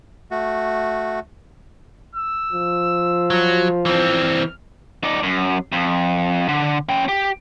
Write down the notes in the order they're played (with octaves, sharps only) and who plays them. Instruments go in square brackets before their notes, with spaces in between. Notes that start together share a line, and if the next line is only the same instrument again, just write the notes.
[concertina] A3 F#4
[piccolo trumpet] E6
[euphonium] F3
[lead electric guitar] F#3
[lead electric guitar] E3 C4 [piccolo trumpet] F6
[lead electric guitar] D#4 D5
F#2
F2
D3
C#4 G5
G4